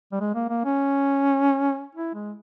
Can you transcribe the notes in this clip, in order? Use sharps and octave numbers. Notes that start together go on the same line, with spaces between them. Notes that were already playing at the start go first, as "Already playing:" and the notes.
G3
G#3
A#3
A#3
C#4
E4
G#3